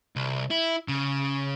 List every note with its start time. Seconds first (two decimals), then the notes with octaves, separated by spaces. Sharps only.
0.16 C2
0.50 E4
0.88 C#3